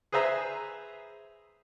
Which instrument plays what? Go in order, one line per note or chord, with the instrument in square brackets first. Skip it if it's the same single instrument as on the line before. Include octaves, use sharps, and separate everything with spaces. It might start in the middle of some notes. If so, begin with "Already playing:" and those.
[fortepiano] G#4 B4 C5 E5 A#5